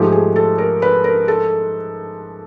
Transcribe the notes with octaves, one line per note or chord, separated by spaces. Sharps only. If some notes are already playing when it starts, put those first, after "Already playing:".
Already playing: G#2 F3 A3 G4
G#4
A4
A#4
B4
A#4
A4